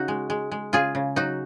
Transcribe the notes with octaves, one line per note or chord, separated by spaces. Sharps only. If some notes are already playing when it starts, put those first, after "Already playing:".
Already playing: C#3 C#4 D#4 F#4
G#3
G#3
G#3
C#3 F4 G#4
C#3
F#3 D#4 F#4